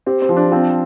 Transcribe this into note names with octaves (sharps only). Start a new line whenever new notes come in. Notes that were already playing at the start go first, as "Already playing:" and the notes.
C4 G4
C4
F3
D4
C4 F4